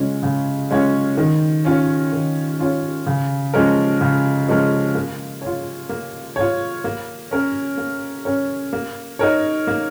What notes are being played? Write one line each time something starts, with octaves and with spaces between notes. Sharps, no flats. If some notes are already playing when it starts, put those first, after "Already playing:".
Already playing: C#3 G#3 C#4 F4 C#5
C#3
G#3 C#4 F4 C#5
D#3
C#4 F4 C#5
D#3
C#4 F4 C#5
C#3
F3 G#3 C#4 A#4
C#3
F3 G#3 C#4 A#4
A#3
F4 C#5
A#3
F4 C#5
A#3
C#4 A#4 C#5
A#3
C#4 A#4 C#5
A#3
D#4 A#4 C#5
A#3